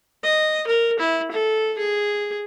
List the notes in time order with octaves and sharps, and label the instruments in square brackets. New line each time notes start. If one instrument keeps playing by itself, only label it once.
[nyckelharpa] D#5
A#4
E4
A4
G#4